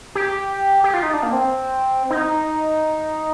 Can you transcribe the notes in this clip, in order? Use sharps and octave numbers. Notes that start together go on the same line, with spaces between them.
G4
G4
F4
D#4
D4
A#3
C4
D#4